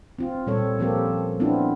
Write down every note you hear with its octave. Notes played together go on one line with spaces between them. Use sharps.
C4 F4
A#2 G3 C4 A4 C#5
F3 A#3 C4 G4 A4
C#4
B3 C4 D4 E4 F4